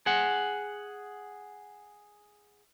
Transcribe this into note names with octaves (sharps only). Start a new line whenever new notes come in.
G#4 F#5